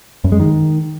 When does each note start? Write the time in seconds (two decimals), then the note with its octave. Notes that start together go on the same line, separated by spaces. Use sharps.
0.24 F#2
0.32 G#3
0.40 D#3